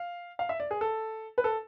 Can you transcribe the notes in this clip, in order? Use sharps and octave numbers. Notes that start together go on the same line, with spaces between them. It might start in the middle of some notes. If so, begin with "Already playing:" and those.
Already playing: F5
F5
E5
D5
G#4
A4
B4
A4